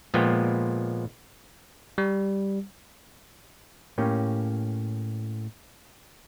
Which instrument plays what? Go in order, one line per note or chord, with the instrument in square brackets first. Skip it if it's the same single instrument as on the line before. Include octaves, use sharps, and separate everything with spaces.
[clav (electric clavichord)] A#2 F3 G#3 B3 G5
[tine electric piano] G3
[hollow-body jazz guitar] A2 A#3 C#4 G4